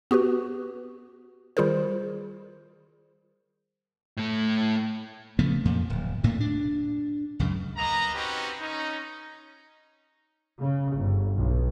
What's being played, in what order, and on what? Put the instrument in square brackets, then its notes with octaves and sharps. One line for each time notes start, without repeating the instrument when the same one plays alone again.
[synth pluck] B3 F#4 G4 B4
D#3 G3 F4 G#4 A#4 C5
[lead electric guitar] A2 A3
[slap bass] C#3 F3 A3 B3
F2 A#2 F3
D1
D2 A2 A3 A#3
D4
C#2 F#2 C#3
[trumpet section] A#3 B3 D#5 A#5
C4 C#4 D#4 F#4 G4 B4
C#4 D#4
[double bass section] C#3
G1
B1